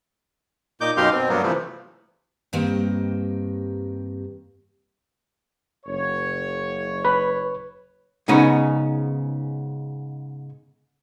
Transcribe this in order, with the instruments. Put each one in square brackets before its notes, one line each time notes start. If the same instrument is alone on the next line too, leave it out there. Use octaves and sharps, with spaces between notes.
[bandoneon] A#2 D#4 D6 G6
F#2 B2 D#4 G4 F5 C6
B2 C4
G2 F#3 A#3 B3
C3 E3 F3 A3
[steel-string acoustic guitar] G2 D#3 A#3 C4 G4 D#5
[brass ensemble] F#1 C#5
[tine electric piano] B4 [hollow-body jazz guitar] B5
[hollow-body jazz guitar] G#2 C#3 B3 C#4 D#4 F#4